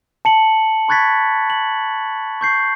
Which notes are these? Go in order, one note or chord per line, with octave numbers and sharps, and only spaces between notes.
A5 C#7 F#7
B5 C#6 F#6 G#6 A6 B6
F#7
C#6 G6 C7